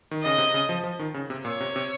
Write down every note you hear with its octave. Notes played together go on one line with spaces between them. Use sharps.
D#3
C#3 D#5
C3
C#3
F3
F3
D#3
C#3
C3
A#2 C#5
C3
C3